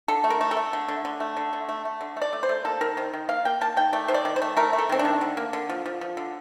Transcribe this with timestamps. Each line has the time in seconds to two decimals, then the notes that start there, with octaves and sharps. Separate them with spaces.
0.08 D3 A4
0.24 A3
0.30 A#4
0.41 A3
0.51 A4
0.57 A3
0.73 D3
0.88 D3
1.05 D3
1.20 A3
1.37 D3
1.53 D3
1.69 A3
1.85 A3
2.01 D3
2.17 A3
2.22 D5
2.33 A3
2.43 C5
2.49 A3
2.65 A#3 A4
2.81 D#3 A#4
2.97 D#3 C5
3.13 D#3
3.29 A#3 F5
3.45 A#3 G5
3.61 A#3 A5
3.77 D#3 G5
3.93 A3 D5
4.08 D#3 C5
4.14 D5
4.25 D#3
4.36 C5
4.42 A3
4.57 A3 A#4
4.73 A3
4.78 A4
4.89 D#3 C4
4.99 D4
5.05 D#3
5.21 D3
5.37 A#3
5.53 D3
5.69 F3
5.86 F3
6.01 F3
6.17 D3